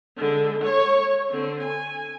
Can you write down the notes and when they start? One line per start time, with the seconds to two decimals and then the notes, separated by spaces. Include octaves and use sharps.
0.17 D3 G#3
0.64 C#5 C#6
1.30 D3 C4
1.63 G#5